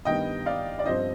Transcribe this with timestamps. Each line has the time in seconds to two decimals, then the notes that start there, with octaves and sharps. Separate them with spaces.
0.05 G2 D#3 G3 B3 D#5 G5
0.46 D5 F5
0.79 D5
0.85 G1 G2 D3 F3 C4 C5 D#5